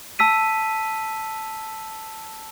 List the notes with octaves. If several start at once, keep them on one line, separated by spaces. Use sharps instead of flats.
A5 E6 B6 D#7